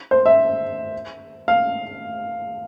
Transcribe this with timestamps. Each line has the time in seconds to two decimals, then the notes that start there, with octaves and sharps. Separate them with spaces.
0.11 C5
0.26 E5
1.48 F5